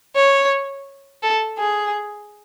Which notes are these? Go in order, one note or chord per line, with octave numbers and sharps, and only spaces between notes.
C#5
A4
G#4